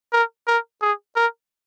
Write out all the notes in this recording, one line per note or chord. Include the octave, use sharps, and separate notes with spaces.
A#4
A#4
G#4
A#4